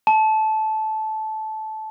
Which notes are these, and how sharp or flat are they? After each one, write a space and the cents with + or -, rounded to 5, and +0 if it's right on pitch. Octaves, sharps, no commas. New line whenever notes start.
A5 -15